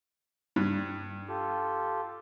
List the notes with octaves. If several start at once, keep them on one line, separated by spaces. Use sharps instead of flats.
G2
F4 G4 A4